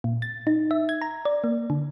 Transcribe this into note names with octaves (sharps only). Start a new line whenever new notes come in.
A#2
A6
D#4
E5
G#6
A#5
D5
A#3
D3